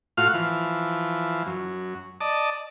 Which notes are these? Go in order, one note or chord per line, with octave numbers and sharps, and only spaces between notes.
A2 F4 F#4 F5 F6
E3 F3
F#2
D5 D#5 A5